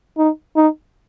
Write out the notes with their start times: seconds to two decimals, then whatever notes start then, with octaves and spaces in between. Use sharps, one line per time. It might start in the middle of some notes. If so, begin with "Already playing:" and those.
0.18 D#4
0.56 D#4